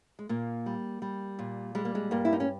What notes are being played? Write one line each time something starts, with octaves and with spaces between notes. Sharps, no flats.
G#3
A#2 A#3
G3
G3
A#2
G3 G#3
A#3
G#3
G2 A#3
E4
D#4
C#4